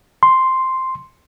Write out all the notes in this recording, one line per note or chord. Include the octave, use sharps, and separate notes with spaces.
C6